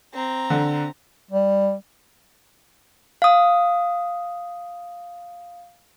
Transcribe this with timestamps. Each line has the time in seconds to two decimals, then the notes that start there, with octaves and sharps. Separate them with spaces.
0.14 C4 A#5
0.50 D3
1.31 G3
3.22 F5 D#6